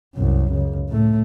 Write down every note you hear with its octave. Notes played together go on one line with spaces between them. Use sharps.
C2 F#2
C#2
A2 A3